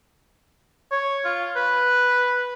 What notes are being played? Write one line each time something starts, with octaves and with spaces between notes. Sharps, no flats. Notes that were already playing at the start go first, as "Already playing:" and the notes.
C#5
F4
B4